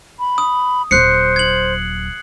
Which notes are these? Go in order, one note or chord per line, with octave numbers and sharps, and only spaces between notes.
B5
D#6
D#1 F#3 C5 F#6 C7 C#7
G#6 F#7